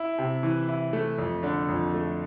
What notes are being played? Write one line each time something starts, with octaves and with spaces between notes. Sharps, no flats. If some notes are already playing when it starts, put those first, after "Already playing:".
Already playing: E4
C3
E3
E4
A3
F2
D3
F2
A3